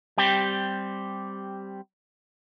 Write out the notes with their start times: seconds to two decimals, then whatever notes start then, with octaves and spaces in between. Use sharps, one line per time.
0.18 G3 C4 G4